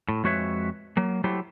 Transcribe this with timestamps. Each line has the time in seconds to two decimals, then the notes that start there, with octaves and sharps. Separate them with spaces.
0.09 A2
0.24 F2 G#3 F#4 B4 C#5 E5
0.97 F#3 A#3
1.24 F#3 A3 E4 G4 C5